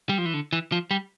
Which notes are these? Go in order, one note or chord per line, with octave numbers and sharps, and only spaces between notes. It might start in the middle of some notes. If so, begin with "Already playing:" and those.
G3
F3
E3
D3
E3
F3
G3